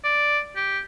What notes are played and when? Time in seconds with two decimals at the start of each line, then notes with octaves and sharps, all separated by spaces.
0.04 D5
0.56 G4